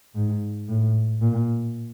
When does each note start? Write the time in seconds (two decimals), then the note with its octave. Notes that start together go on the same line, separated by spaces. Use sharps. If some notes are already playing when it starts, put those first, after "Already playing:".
0.15 G#2
0.68 A2
1.21 A#2